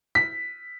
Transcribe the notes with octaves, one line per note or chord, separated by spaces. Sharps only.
B6